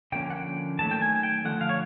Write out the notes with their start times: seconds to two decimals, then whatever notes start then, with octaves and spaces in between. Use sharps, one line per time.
0.12 D3 F3 A#3 C#4 G5
0.30 F#5
0.35 G5
0.79 D#3 F#3 A3 A5
0.91 G5
1.01 G#5
1.23 G5
1.45 D3 F3 A3 F#5
1.61 F5
1.69 C#5